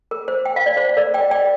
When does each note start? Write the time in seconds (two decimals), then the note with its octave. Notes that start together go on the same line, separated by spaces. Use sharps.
0.11 A#4
0.28 C5
0.45 G5
0.56 F5
0.66 D5
0.77 C5 F5
0.97 A#4 D5
1.14 D5 G5
1.31 D5 G5